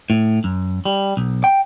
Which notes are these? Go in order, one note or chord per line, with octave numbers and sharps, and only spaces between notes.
A2
F#2
G3
B1
G5